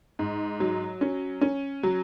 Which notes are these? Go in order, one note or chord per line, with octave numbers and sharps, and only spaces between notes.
G#2
F#3
C#4
C#4
F#3